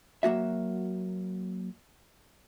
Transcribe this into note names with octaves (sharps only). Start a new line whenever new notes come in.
F#3 A#3 F#4 E5